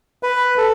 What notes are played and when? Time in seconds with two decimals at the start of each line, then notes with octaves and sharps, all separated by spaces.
0.23 B4
0.58 A4